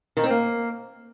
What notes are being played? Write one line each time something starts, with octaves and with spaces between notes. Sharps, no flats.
D#3
C4
A#3